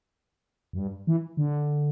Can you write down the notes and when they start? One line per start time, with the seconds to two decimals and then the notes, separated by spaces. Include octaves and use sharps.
0.73 F#2
0.78 G2
1.07 E3
1.37 D3